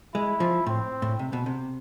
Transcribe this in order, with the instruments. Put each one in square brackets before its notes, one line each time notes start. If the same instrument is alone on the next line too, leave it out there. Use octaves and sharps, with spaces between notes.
[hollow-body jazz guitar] G#3 [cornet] E4
[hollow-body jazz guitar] F3
[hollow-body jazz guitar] A2 [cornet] C4
[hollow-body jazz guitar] A2
C3
B2
C3